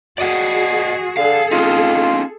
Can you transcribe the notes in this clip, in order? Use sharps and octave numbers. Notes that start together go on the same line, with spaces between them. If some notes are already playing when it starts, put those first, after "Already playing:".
F#4 G#4 D5 D#5 F#5
D3 G#4 A4 F5
C4 C#4 D#4 F4